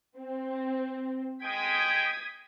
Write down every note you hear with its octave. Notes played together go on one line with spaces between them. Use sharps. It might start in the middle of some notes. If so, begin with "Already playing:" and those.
C4
G#3 G5 D#6 G#6 B6